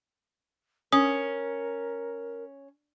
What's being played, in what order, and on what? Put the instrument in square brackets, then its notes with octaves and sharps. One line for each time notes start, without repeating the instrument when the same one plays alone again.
[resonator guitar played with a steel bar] C#4 [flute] A#4 [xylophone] D#6